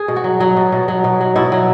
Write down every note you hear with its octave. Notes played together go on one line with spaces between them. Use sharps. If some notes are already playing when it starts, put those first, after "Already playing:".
Already playing: G#4
B2
F#4
F#3
F#3
B2
B2
F#3
B2
F#3
B2 E4
F#3